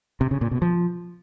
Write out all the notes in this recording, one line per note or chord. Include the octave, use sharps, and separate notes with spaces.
C3
C#3
A#2
B2
F3